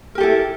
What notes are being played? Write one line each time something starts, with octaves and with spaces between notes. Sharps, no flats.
E4 G4 A4 A#4